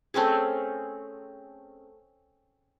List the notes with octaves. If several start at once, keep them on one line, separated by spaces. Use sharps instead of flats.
A3 C4 C#4 G#4